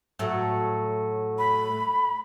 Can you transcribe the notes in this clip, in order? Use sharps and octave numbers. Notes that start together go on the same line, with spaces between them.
A2 F#3 A3
B5